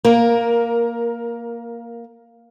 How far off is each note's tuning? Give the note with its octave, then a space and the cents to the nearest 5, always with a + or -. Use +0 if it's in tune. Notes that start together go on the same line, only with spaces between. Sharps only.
A#3 +0 A#4 +15